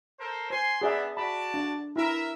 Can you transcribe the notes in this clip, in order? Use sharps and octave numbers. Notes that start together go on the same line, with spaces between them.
A4 A#4 C5
C5 G#5 C6
B3 D4 G#4 D5 E5
F#4 D5 A5 B5
D4
E4 A#4 E5